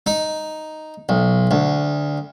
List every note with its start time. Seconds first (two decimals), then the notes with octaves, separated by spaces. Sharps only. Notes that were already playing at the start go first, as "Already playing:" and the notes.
0.07 D#4
1.09 B1
1.51 D2